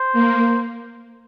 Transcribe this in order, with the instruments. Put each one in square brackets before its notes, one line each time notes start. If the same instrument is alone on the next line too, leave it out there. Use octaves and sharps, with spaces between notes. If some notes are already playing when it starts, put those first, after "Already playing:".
Already playing: [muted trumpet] C5
[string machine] A#3